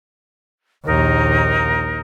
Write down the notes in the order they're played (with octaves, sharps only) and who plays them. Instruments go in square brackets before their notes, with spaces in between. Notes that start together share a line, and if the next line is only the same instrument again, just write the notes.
[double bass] A#1 D#2 [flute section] D#4 A#4